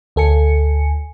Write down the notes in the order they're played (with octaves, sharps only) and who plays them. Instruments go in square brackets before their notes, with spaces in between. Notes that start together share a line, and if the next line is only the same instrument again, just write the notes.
[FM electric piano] D2 A4 G#5 C#7